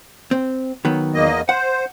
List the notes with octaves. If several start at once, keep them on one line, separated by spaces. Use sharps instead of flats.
C4
D#3 F#3 B3
E2 A#3 D#5
C5 F#5